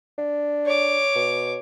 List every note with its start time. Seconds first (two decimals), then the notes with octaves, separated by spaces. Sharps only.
0.18 D4
0.65 C#5 D6
1.16 B2